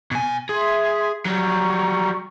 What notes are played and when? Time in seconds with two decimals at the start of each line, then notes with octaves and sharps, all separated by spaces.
0.11 B2 G#5
0.49 G#4 E5 C6
1.25 F#3 G3 A#5 C#6